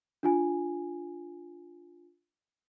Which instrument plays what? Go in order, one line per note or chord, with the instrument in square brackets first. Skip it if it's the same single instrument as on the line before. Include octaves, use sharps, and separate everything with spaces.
[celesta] D4 F4 G#5